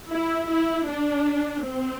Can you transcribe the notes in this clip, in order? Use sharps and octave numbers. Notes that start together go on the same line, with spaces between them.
E4
E4
D4
C4